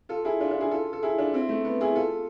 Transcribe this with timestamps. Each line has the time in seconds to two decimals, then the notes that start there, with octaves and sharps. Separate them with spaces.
0.09 F4 A4
0.25 E4 G#4
0.41 D4 F4
0.51 D4 F4
0.61 E4 G#4
0.71 F4 A4
0.93 A4
1.03 E4 G#4
1.18 D4 F4
1.34 C4 E4
1.49 A3
1.65 B3
1.81 E4 G#4
1.96 F4 A4